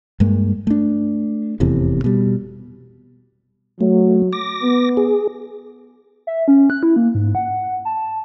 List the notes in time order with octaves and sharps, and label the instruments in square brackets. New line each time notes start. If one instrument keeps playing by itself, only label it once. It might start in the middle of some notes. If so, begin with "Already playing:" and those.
[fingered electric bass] G2 G#3 A#3
A3 D4
F1 E2 A2 C3
B2 G3
[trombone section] F#3 [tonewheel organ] A3
[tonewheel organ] D6 A#6
[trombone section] B3
[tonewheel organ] G#4
[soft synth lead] E5
C#4
F#6
E4
A#3
G#2
F#5
A5